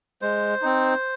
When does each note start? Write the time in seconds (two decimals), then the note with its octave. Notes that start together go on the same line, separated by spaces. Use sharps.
0.22 G#3 C5
0.62 C4 D#4